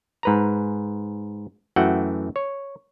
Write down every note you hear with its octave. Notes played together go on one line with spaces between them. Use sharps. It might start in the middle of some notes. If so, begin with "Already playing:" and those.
G#2 B4 A#5
F#2 E3 A3 F#4 F#5 G5
C#5